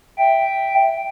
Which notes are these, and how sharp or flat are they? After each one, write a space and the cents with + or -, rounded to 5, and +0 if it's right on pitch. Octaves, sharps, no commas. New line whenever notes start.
E5 +0 G5 +0